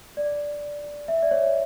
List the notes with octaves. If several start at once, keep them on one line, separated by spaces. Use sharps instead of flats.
D5
E5
D5
C#5